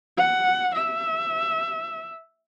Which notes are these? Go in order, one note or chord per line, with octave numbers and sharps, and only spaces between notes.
F#5
E5